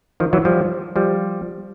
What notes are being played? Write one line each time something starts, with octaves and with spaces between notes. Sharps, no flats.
D#3 F3
E3 F#3
F3 G3
F3 G3